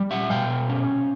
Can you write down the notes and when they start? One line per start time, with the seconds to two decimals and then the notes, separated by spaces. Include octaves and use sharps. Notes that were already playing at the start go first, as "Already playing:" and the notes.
Already playing: G3
0.11 E5 F#5
0.30 B2 F5 G5
0.69 C#4